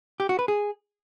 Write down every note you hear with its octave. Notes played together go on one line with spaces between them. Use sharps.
G4
F#4
B4
G#4